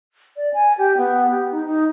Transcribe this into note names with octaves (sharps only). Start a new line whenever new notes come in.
D5
G#5
G4
B3
G4
D#4
D#4